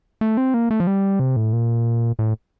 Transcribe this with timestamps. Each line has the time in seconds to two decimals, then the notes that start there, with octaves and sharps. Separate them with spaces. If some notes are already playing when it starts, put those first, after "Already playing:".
0.21 A3
0.37 C4
0.54 A#3
0.71 A3
0.80 F3
0.87 G3
1.20 C3
1.36 A2
1.53 A#2
2.19 A2